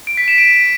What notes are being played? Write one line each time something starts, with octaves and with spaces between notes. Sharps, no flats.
D7
B6
E7
D7